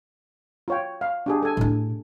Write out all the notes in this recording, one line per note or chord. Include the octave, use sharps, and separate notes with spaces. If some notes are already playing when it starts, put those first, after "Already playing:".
F4 C#5 G5
F5
D4 G4 G#4
A4 G#5
A2 D4